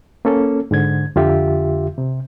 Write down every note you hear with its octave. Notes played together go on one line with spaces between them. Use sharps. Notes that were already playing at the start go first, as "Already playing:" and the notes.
A#3 C#4 A4
G#2 D3 G#6
F2 D3 F4 G4 E5
C3